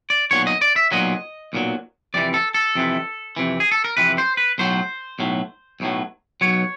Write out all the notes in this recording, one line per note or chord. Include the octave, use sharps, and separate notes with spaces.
D5
B1 A#2 F#3 C#5
D#5
D5
E5
B1 A#2 F#3 D#5
B1 A#2 F#3
F2 C3 E3 D5
A4
A4
F2 C3 E3
F2 C3 E3
G#4
A4
A#4
F2 C3 E3 B4
C5
B4
B1 A2 F#3 C5
B1 A2 F#3
B1 A2 F#3
B1 A2 F#3 C#5